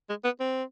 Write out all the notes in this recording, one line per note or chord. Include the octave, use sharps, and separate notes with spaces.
G#3
B3
C4